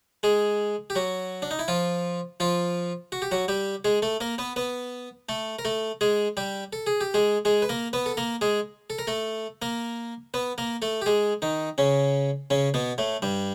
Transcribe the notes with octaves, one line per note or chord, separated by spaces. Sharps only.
G#3 G#4
G4
F#3 F#4
D4
D#4
E4
F3 F4
F3 F4
F#4
G4
F#3 F#4
G3 G4
G#3 G#4
A3 A4
A#3 A#4
B3 B4
B3 B4
A3 A4
A#4
A3 A4
G#3 G#4
G3 G4
A4
G#4
G4
G#3 G#4
G#3 G#4
B4
A#3 A#4
B3 B4
A4
A#3 A#4
G#3 G#4
A4
A#4
A3 A4
A#3 A#4
B3 B4
A#3 A#4
A3 A4
G4
G#3 G#4
D#3 D#4
C#3 C#4
C#3 C#4
B2 B3
A2 A3
G2 G3